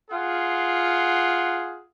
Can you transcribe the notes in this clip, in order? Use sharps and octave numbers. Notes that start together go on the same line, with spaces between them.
F4 G#4 F#5